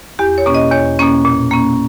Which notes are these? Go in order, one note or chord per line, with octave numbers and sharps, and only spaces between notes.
E2 G4
C#5
B2 A#3 C#4
D#5
E2 C#5
B2 A#3 C#4
A#2
A#3 C#4